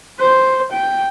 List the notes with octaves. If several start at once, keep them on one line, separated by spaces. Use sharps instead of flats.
C5
G5